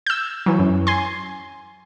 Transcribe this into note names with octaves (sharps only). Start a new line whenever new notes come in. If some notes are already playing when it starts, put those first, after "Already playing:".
E6 G6
E3 F#3
F#2
G#5 C6